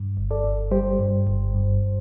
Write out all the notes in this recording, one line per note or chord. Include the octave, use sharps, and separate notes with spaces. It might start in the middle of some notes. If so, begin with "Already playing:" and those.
Already playing: G2
G1
A4 D5
G1
G3 G4 C5
G2
G1
G2